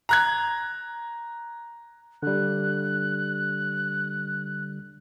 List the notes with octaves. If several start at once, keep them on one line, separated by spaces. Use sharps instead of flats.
A#5 F#6 G#6
D3 G3 F#6